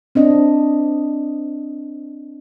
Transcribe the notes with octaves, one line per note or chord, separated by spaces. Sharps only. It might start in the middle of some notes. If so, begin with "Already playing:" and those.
C4 D4 D#5